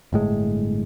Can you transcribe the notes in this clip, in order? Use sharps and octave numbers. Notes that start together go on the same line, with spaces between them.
G1 A2 G#3